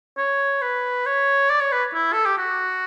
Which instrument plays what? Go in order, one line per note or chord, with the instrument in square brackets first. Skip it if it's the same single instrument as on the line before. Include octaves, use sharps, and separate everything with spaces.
[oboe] C#5
B4
C#5
D5
C#5
B4
E4
A4
G4
F#4